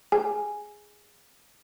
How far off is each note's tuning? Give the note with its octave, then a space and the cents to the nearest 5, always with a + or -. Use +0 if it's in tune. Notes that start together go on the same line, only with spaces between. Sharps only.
G#4 +0 G#5 +0